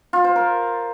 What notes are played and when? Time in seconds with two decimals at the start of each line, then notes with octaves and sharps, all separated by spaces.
0.13 F4
0.24 C5
0.36 A#4